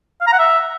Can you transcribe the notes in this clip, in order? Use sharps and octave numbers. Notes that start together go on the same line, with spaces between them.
F5
A#5
F#5
E5